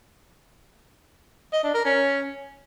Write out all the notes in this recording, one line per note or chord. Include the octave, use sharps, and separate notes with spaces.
D#5
D4
A#4
C#4